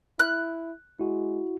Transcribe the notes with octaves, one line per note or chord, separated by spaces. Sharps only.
E4 F#6
G#3 E4 F#4